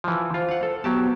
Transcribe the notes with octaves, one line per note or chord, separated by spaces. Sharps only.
E3 F3
F4 C5
F5 F#5
A4
F#3 B3 G4 A5